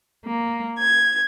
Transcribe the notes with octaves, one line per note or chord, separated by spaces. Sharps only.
A#3
G#6